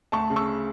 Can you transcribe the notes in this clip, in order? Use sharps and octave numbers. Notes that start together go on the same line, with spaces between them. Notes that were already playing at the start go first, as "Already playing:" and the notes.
D2 A5 C#6
C#3
C#6 E6